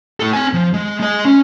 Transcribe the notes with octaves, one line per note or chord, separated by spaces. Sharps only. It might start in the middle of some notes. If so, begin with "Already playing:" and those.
A2 A4
C4 G#5
F3
G#3
G#3 D#5
C#4